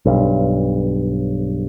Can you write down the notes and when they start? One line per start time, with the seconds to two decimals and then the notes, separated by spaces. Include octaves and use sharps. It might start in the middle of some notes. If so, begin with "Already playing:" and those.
0.05 B1 G2